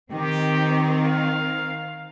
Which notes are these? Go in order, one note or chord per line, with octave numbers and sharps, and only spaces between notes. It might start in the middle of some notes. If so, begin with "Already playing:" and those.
D#3 C4 G4
F5